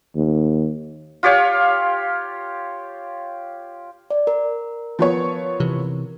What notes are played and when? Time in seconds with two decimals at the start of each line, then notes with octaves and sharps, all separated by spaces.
0.16 D#2
1.23 F4 G4 C#5 F5
4.11 D5
4.27 A#4
4.99 F3 B3 C#5
5.60 C3 E3